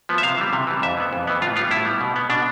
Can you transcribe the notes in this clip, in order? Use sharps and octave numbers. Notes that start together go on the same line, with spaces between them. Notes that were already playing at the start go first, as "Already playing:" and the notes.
F3 B3
E5
C3 F5
E3 G3
C3
E3 G3
F2 E5
E3 B3
F2
E3 B3
A2 F4
G3 B3 F4
A2 E4
G3 B3
B2
B3
B2 D4